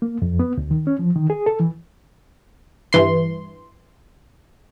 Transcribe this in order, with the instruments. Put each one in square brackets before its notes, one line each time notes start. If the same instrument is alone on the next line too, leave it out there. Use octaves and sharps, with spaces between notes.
[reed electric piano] A#3
F2
B3
D2
D#3
C#4
F3
D#3
G#4
A4
E3
[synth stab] G2 E3 C6